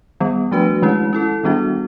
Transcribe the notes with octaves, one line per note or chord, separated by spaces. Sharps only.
D#3 G3 B3
F3 A3 D4 F#4 B4
D#3 G#3 C#4 E4
C#4 E4 A4
D#3 G3 B3 D4 F#4